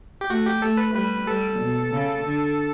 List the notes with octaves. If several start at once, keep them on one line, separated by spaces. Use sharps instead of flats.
G4
A3 F#4
G4
A3 A4
B4
G3 B4
G3 A4
B2
C#3
D3